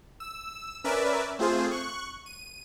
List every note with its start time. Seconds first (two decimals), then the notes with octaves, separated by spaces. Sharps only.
0.20 E6
0.84 C#4 A#4 B4 D5 E5
1.39 A3 C4 F4 G#4 C5
1.71 C#6 F#6
2.26 D#7